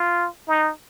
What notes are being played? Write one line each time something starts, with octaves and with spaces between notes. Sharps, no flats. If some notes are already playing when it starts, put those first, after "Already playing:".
Already playing: F4
D#4